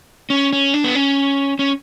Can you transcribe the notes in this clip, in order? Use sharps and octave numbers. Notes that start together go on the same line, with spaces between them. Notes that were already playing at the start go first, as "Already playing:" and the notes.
C#4
C#4
D4
B3
C#4
C#4